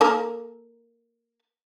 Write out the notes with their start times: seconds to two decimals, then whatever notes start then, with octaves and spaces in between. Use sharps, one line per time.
0.01 A#3 A4 A#4